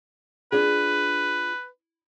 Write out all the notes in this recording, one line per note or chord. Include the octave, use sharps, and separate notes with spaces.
D4 F4 G#4 B4